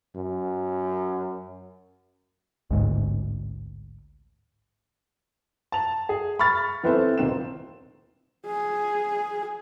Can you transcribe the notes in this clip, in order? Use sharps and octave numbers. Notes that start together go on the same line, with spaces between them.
F#2
A1 D2 G#2
A5 F7
G#4
B5 C#6 F6 A6
E3 B3 C4 E4 A4 C5
D#1 D#3 C4 E7
G#4